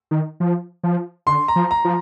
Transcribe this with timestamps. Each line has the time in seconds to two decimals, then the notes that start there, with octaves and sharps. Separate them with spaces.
0.11 D#3
0.40 F3
0.83 F3
1.27 D3 C6
1.48 A#5
1.56 F3
1.71 A#5
1.85 F3